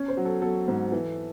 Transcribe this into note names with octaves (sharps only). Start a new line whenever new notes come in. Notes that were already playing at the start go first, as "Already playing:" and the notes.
Already playing: C#4 C#5
C5
F#3
A4
F#3 A4
G#2
E3